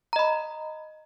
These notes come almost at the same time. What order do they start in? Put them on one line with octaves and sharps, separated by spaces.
A#5 D#5 B5